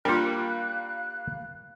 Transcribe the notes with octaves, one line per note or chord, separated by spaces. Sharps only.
G3 A#3 D4 F4 A#4 F5 G5 F#6